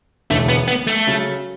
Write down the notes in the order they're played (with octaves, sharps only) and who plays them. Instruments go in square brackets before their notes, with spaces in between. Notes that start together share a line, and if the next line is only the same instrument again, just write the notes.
[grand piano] E1 D2 C#3 E3 [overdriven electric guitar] A3
[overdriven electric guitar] B3
B3
A3
[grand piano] C#3 F#3